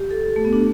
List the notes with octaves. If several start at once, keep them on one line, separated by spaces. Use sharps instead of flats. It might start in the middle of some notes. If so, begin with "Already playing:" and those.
Already playing: G4
A4
A3
B3
D4